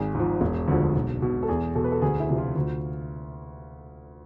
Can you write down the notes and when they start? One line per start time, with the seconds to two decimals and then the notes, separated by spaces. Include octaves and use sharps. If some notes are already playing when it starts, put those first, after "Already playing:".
Already playing: G#1 G#4
0.15 G#2
0.20 F3
0.41 E1
0.68 D2 D3 F3
0.95 B1
1.22 B2
1.43 A4
1.49 E2 G#4
1.75 B2 A4
1.84 B4
1.92 A4
2.02 D2 G#4
2.20 E4
2.29 C3 F3
2.38 F4
2.56 D2